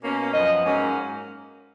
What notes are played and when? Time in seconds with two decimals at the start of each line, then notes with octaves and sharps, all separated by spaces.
0.02 B2 A#3 C#4
0.22 F5
0.33 F#2 F3 B3 D#5
0.64 G#2 F#3 A#3 C#4